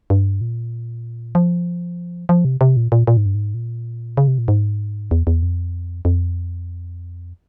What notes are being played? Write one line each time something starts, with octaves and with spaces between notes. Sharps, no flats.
G2
A#2
F3
F3
C3
C3
A#2
A#2
A#2
G#2
G2
G#2
A#2
C#3
C3
A#2
G#2
E2
E2
F2
F2